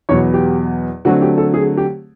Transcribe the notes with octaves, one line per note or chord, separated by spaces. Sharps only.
E2 B2 F#3 B3 C#5
G4
D3 F#3 A3 C4 F#4
G4
A4
G#4
G4